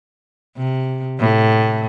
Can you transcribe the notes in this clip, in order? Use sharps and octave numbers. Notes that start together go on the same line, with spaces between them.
C3
A2